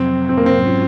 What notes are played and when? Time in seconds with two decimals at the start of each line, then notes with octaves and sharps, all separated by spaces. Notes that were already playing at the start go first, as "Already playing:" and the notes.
Already playing: F2 C3 F#3 C4
0.29 C4
0.37 A#3
0.46 C4
0.54 G#2 F#3 C#4 F4